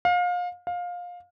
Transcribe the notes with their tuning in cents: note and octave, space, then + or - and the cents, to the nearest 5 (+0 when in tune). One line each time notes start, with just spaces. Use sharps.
F5 +30
F5 +20